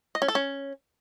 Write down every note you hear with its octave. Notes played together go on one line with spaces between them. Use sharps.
D#5
C#4
A4
C#4